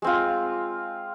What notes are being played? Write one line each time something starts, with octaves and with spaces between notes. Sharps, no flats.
G#3 C4 F4